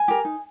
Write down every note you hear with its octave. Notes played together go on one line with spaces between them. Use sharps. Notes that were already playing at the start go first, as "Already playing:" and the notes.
Already playing: G#5
G4 A#4
D#4